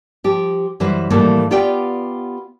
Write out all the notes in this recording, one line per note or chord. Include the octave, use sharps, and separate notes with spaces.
F3 G4
F#2 E3 G3 B4 C5
A2 E3 F3 G3 A3 A#3
B3 F4 G4 B4 D5 G5